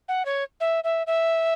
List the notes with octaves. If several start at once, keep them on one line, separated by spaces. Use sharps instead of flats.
F#5
C#5
E5
E5
E5